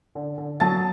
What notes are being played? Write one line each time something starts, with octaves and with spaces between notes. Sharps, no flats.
D3
D3
F#3 A5 A6